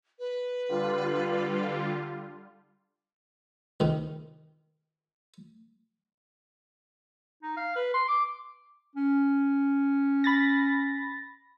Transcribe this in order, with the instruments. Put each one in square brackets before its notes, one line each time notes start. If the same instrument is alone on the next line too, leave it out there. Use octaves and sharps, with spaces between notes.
[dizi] B4
[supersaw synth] D3 G3 F4
[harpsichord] C2 D#3
[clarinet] D#4
F5
B4
C6
D6
C#4
[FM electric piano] B5 A6 A#6